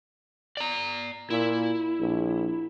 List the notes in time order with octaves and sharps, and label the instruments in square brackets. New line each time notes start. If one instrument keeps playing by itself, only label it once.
[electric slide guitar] D5 A#5
[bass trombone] A#2 [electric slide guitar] E4
[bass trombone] A#1